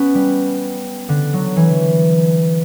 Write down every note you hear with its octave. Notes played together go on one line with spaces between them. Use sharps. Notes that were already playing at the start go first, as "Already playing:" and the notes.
Already playing: B3 C#4
G3
D3
F#3
E3